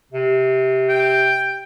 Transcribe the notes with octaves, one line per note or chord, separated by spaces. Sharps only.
C3
G5